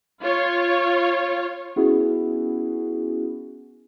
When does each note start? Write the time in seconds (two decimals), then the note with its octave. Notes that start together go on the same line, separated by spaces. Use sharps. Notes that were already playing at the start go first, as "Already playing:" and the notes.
0.23 F4 C#5
1.76 B3 C#4 E4 F#4 G#4